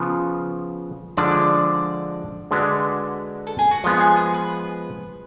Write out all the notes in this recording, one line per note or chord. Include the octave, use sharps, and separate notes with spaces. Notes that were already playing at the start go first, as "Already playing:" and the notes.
Already playing: C#3 F3 B3 F4
D3 F3 G#3 D4 D5
D3 G#3 D4 F#4 B4
A4
G#4
F#4
F3 G#3 B3 F4
G#4
G#4
B4